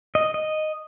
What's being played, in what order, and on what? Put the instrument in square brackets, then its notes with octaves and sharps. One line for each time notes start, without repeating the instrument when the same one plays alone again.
[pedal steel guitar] D#5
D#5